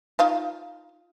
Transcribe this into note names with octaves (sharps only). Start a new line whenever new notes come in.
D#4 F4 F5